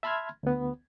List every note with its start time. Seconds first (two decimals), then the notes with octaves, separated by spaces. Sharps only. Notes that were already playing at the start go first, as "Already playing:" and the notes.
0.03 E5 A5 B5 C6 F6 G#6
0.43 D2 B3